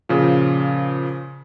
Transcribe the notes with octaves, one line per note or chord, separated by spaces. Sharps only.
A#2 C#3 F3